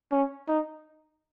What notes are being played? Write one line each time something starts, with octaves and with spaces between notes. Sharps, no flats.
C#4
D#4